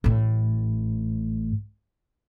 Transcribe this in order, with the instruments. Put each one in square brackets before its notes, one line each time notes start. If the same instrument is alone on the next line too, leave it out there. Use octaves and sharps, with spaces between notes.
[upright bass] A1 A2